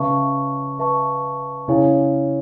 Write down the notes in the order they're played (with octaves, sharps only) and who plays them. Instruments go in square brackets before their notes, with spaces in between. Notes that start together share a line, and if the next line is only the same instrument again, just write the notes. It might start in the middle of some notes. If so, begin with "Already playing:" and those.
Already playing: [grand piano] C#3 [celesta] B4 E5 A5 C#6
[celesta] B4 E5 A5 C#6
[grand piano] C#3 [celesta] E4 G#4 C#5 G#5